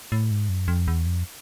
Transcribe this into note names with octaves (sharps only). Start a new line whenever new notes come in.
A2
G#2
F#2
F2
E2
F2